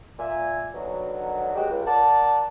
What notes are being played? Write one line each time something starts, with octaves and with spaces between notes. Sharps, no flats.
A#2 E5 G#5
B2 D3 D#3 F#3
B2 G#3 F#4 G4
C#2
A#4 D5 F#5 A5